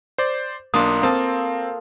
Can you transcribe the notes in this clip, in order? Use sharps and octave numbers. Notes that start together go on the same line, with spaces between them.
C5 D5
B1 A#3 D4 F4 D#6
A#3 C4 A4